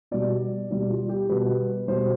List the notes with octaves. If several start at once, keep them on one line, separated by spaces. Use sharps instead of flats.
B2 G3 D5
B2 G3 D5
F4
G4
B2 G3 B4
B2 G3 C5